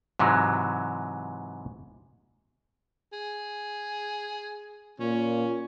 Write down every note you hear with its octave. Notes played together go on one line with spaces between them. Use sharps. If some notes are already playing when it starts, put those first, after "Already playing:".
G#2 C3 E3 F#3 G#3
G#4
A#2 C#4